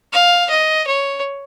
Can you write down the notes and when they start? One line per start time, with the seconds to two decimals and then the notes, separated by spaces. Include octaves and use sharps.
0.13 F5
0.50 D#5
0.87 C#5